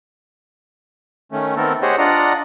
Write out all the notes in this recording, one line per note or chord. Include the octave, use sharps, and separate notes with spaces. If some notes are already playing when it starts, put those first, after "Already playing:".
D#3 A3 C#4
D#3 A3 B3 C4 A4 A#4
G4 G#4 C5 C#5 D#5 F#5
D4 F4 D5 D#5 F#5 A#5